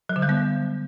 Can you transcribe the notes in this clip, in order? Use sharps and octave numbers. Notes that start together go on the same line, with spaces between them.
F#3
D3
G3
B3